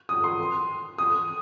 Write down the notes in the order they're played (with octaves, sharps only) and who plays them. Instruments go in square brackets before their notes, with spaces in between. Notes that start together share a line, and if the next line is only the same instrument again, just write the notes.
[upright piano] D#6
C6
D#6